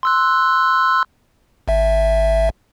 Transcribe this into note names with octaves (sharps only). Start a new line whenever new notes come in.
C6 E6 F#6
G#1 E5